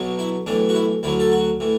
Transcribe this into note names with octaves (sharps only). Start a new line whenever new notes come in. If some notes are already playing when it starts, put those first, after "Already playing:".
Already playing: B1 B2 F#3
E4
B1 A2 E3 D4
F#4
E4
D2 D3 F#3 E4
A4
F#4
A2 E3